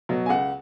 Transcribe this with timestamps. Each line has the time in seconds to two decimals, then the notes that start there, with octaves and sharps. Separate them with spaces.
0.09 B2 F#3
0.26 G#5
0.29 C#2 F#5